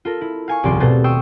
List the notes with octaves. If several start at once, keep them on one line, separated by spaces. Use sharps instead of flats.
F4 A4 A#4
E4
F5 G#5 C#6
D#1 C2 G#2 F3 D5 C6
B2 A3 G#4 A4 C5 A6
G5 C6 C#6 D#6 E6